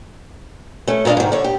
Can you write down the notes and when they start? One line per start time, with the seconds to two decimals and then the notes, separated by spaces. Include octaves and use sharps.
0.88 A3 C#4
1.05 A#2 B3 D4 D#5 F5
1.17 G#2 D#3
1.32 D3 C#5
1.44 G4